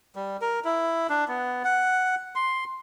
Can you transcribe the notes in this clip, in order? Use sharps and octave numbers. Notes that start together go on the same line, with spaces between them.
G3
A#4
E4
D4
B3
F#5
C6